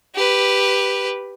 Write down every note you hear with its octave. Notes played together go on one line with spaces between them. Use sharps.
G4 B4